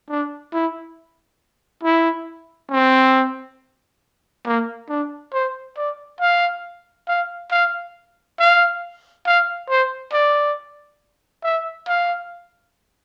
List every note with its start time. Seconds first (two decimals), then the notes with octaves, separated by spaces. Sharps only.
0.09 D4
0.53 E4
1.83 E4
2.71 C4
4.46 A#3
4.89 D4
5.33 C5
5.77 D5
6.20 F5
7.08 F5
7.51 F5
8.39 F5
9.26 F5
9.69 C5
10.13 D5
11.44 E5
11.88 F5